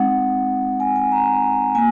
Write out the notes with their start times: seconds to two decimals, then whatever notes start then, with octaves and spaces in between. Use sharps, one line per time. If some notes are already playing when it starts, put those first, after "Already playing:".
Already playing: G#3 C4 D#4 F#5
0.80 G#5
0.96 G#5
1.12 A#5
1.75 A#3 G#5